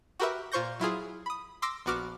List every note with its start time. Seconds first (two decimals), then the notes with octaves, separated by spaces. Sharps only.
0.20 F#4 G4 A#4 B4 E5
0.52 A#2 F4 C5 C#6 G6 A#6
0.80 F#3 E4 F4 G#4
1.26 B5 D#6
1.62 C6 D6 E6 A#6 C7 D7
1.86 A#1 B3 F#4 D6 F6